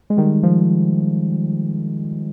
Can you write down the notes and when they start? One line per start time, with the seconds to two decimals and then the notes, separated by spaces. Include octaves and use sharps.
0.10 G#3
0.17 D#3 G3
0.43 F3